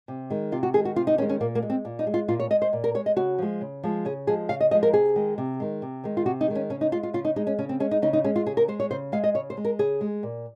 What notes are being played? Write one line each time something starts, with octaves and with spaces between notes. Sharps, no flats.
C3
D#3 G#3
C3 F4
F#4
D#3 G#3 G#4
F#4
C3 F4
D#4
D#3 G#3 C#4
C#4
A#2 A#3
A#3
G#3
C4
A#2
D#4
G#3
F4
A#2 F4
C#5
G#3 D#5
C5
A#2
A#4
G#3 C#5
D#5
C#3 F#4
F3 G#3
C#3
F3 G#3
C#3 G#4
F3 G#3 G#4
C#3 F5
D#5
F3 G#3 D#5
A#4
C3 G#4
D#3 G#3
C3
D#3 G#3
C3
D#3 G#3
F4
C3 F#4
D#4
D#3 G#3
C#4
C#3 C#4
D#4
G#3 F4
F4
C#3 F4
D#4
G#3 D#4
C#4
C#3 C#4
C4
G#3 C#4
D#4
C#3 D#4
D#4
G#3 C#4
F4
C#3 G#4
A#4
G#3 C5
C#5
C#3 C5
G#3 F5
D#5
C#3 C#5
C5
G#3
A#4
C#3 G#4
G#3
A#2